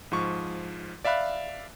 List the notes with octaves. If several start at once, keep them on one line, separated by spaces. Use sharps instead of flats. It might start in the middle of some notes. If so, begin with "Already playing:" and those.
G#2 F3 C#6
D5 E5 F5 B5 F#6